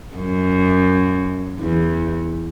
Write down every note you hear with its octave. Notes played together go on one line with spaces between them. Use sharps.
F#2
E2